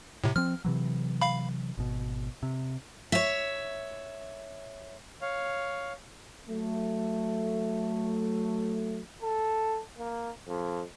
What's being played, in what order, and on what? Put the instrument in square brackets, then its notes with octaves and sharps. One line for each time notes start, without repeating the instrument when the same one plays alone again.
[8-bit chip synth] A2 C3
[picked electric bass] F3 C4 [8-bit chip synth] F6
[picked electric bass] C3 E3 F#3
[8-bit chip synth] F5 B5
[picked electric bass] G#1 B2
C3
[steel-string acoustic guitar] C#5 E5
[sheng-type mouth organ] C#5 F5
[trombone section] F#3 A3
[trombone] A4
A#3
F2